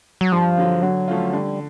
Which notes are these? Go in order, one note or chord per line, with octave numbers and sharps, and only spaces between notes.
F#3
G2 F3
D3 F#3
D3 F#3
F3 A3 C#4 F4
D3 G3